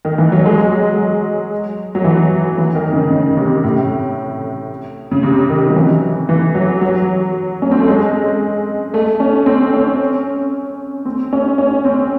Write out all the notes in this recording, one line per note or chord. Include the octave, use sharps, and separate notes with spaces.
D#3
E3
F#3
G#3
F#3
F#3
E3
E3
D#3
C#3
C#3
C3
A2
C#3
C3
D#3
F#3
E3
E3
F#3
F#3
C#4
C4
A3
G#3
A3
C#4
C4
C#4
C4
C#4
C#4
C4